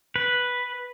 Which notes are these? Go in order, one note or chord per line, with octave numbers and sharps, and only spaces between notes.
B4